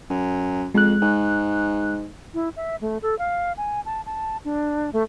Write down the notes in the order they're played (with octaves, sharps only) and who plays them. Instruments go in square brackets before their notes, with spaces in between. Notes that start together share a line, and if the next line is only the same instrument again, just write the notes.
[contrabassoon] F#2
[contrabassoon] F2 [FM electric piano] G#3 F#6
[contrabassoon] G#2
[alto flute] E4
E5
A3
A4
F5
G#5
A5
A5
D4
A3